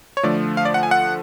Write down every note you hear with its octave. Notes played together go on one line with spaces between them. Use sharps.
C#5
D3 F3 A3 D5
F5
D5
F#5
G#5
F#5